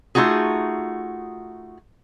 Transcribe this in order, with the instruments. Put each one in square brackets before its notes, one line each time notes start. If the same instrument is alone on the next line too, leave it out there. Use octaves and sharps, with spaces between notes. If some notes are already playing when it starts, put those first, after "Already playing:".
[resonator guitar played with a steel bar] A3 D#4 F4 F#4 G#4